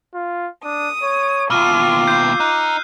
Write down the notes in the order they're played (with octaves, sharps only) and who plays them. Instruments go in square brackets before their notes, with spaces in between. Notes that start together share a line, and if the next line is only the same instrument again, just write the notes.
[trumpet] F4
[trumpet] D4 [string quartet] D#6
[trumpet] C#5
[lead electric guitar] D#2 B2 [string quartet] F4 [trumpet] D6 [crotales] E6 F6 D#7
[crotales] G6 C7
[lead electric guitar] D#4 [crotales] F#6